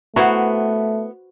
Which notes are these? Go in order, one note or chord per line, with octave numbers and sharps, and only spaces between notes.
A3 B3 E4 F#4 B4 C5 A#5